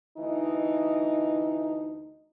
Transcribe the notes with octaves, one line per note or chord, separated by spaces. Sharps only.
D2 E3 D#4